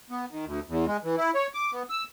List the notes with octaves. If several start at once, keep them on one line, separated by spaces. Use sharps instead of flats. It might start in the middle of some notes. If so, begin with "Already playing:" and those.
B3
D#3
D2
E2
G#3
E3
E4
C#5
D6
B3
E6